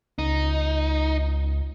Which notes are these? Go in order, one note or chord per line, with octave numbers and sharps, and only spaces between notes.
C#2 D#4